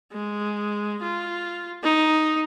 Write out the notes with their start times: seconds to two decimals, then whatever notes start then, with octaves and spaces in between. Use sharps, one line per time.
0.12 G#3
1.02 F4
1.83 D#4